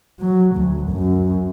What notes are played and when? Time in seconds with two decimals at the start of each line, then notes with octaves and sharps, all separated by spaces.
0.19 F#3
0.56 D2
0.90 F#2